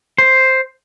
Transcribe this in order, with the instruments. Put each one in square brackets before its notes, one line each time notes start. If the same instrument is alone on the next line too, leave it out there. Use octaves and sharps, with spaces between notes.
[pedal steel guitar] C5